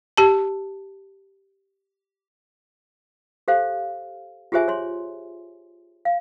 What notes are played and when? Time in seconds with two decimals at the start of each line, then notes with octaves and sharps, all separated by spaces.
0.17 G4 A5
3.48 G4 A4 C5 F5
4.52 F4 G4 G#4 C5 E5 G#5
4.68 C#5 C6
6.05 F5